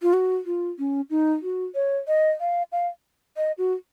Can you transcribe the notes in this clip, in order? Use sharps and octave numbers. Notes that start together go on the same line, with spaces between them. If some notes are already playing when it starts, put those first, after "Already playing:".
F4
F#4
F4
C#4
D#4
F#4
C#5
D#5
F5
F5
D#5
F#4